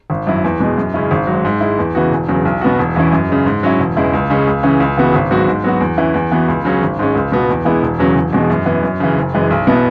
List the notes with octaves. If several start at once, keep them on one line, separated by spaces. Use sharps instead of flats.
G#1
F#2 F#3 E4
E2
B2 G#3
F#2
C#3 G#3 C#4 E4
G#1
G#2 F#3
G#2
G#3 E4
E2
C#3 E3 B3 F#4
E1
E2 C#3 F#3
B1
B2 B3 F#4
E1
E2 E3 C#4 E4
F#2
C#3 G#3
G#2
F#3 C#4 E4
E1
E2 C#3 G#3 E4
C#2
C#3 G#3 C#4
C#2
C#3 E3 C#4
C#2
C#3 E3 B3 F#4
G#1
G#2 F#3 B3 F#4
G#2
F#3 B3 F#4
E2
E3 C#4 E4
E2
E3 B3 F#4
C#2
C#3 F#3 C#4
G#1
G#2 G#3 C#4
C#2
B2 B3 F#4
E2
E3 G#3 B3 E4
E1
E2 C#3 F#3 C#4
E1
E2 B2 G#3
F#2
E3 B3
F#2
C#3 E3
F#1
F#2 E3 G#3
B1
B2 B3 E4